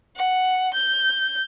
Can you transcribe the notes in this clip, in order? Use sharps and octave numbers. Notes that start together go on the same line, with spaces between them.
F#5
G6